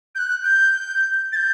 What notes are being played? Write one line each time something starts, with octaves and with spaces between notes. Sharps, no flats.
G6
F#6
G6
A6
G6